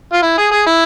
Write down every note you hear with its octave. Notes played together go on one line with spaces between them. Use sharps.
F4
E4
G#4
G#4
E4